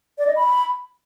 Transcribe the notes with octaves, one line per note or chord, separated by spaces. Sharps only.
D5
D#5
B5